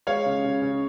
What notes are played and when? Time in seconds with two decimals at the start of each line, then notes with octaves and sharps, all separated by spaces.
0.07 G#3 C#5 F5
0.26 C#3
0.44 C#3
0.62 C#3